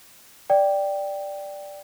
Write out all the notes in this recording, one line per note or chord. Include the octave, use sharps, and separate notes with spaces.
D5 G5